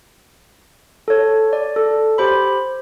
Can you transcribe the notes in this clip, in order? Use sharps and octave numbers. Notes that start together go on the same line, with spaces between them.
A4 C#5
D5
A4
G4 C5 B5